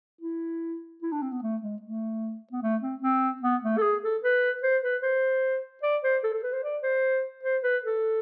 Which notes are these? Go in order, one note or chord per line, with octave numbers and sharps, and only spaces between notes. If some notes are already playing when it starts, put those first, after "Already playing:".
E4
E4
D4
C4
B3
A3
G#3
A3
B3
A3
C4
C4
B3
A3
A4
G#4
A4
B4
C5
B4
C5
D5
C5
A4
A4
B4
C5
D5
C5
C5
B4
A4